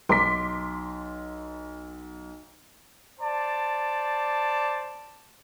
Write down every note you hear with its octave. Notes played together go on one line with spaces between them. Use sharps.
B1 C6 D6 B6
C5 D5 A5